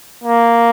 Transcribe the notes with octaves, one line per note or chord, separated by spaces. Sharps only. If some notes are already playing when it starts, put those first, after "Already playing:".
A#3